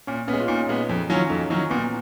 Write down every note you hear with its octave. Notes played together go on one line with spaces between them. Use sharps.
A#2 C#4
B3 C#4
G#3
F4
A#2 D#4
G#3 B3
F2
D#3 F#3 C#4 F4
F2 D#4
D#3 F#3 C#4
A#2 B3